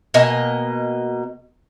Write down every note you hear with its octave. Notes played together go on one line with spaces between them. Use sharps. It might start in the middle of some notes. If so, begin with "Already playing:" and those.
B2 A#3 D#5 G#5